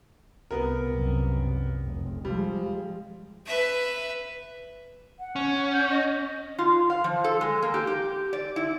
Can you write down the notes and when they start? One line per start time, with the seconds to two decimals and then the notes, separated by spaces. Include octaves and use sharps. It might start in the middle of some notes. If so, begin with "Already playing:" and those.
0.51 C2 B3 A#4
0.86 C2 F#2
1.83 F1
2.25 F3 G3 G#3
3.46 B4 E5
5.19 F#5
5.36 C#4
5.72 G6
5.90 D#5
6.59 F4
6.90 F5
7.04 F3
7.24 A4
7.41 G#3
7.62 A#3
7.74 G4
7.87 G4
8.33 D5
8.56 E4